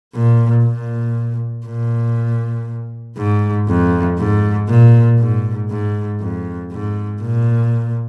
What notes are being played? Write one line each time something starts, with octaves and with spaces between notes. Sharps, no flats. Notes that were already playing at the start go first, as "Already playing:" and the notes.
A#2
A#2
A#2
G#2
F2
G#2
A#2
G#2
G#2
F2
G#2
A#2